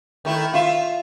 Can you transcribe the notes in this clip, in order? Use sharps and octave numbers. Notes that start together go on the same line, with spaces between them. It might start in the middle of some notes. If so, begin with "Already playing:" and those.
D#3 A3 E4
F4 E5